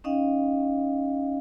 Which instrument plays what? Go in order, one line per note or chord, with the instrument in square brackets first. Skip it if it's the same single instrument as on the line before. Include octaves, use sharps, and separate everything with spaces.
[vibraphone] C#4 D#4 D#5 F5 G5